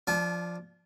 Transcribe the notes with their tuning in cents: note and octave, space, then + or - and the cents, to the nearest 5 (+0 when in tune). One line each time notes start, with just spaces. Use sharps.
F3 +0 D4 +0 A5 -35